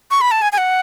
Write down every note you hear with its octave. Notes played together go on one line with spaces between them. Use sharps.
C#6
B5
A5
G#5
G#5
F#5